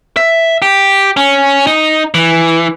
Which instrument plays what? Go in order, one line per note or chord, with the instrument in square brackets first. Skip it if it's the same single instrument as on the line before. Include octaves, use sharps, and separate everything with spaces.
[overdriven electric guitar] E5
G4
C#4
D#4
E3